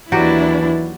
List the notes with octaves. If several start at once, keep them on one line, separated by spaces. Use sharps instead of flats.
D#2 E3 F#3 D4 E4 F#4 G4